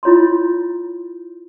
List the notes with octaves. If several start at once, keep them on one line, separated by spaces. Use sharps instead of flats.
E4 F4 C#5 A#5 C6